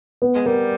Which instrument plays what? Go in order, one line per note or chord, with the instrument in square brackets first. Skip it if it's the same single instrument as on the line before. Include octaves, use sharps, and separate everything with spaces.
[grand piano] B3
[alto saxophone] G#3
[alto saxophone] G3 [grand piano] A#4